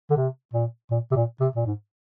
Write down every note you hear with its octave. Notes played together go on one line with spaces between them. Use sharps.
D3
C3
A#2
A#2
C3
A#2
C3
A#2
G#2